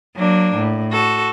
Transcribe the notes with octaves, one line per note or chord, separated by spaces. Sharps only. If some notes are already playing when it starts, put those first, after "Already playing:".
F#3 A#3 D4
A2
F#4 A4